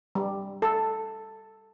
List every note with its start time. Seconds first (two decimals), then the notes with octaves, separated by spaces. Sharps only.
0.15 G3
0.62 A4